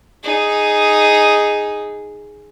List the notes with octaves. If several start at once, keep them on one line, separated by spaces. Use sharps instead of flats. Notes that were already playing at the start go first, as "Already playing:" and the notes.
D#4 G#4